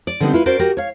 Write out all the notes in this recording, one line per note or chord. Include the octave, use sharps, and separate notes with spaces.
D5
D3 G3 B3 C4 D#4
E4 F4 B4
C#4 F#4 A#4 C5 D5
F#4 G4 A#4
C#5 F5